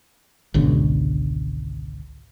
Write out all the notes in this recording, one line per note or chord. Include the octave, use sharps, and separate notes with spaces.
G#1 C#2 B2 D3